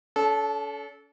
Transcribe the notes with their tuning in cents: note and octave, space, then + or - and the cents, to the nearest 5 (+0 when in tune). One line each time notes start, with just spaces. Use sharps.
C#4 +45 A4 -20